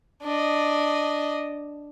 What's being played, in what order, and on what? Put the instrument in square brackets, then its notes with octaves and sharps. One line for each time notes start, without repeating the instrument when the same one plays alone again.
[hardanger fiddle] D4 D#5